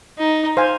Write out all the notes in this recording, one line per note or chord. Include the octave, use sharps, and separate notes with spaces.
D#4
C5 F5 G#5